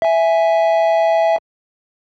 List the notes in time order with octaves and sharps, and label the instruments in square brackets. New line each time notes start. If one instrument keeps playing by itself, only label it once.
[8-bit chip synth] E5 G#5